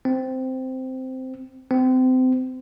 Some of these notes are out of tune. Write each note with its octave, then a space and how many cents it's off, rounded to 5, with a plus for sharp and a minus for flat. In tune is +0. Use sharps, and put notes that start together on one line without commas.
C4 -10
C4 -30